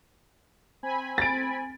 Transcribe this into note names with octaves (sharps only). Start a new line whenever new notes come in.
C4 G#5 B5
A6 D7